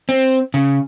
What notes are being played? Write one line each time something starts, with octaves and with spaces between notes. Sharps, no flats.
C4
C#3